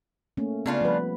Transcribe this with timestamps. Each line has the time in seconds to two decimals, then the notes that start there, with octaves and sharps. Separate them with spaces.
0.37 A3 A#3 C#4
0.66 C#3 B3 D4 F4
0.81 F3 G3 B4